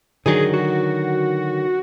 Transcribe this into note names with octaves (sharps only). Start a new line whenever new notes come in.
D3 D#3 F#3 G#4
F#4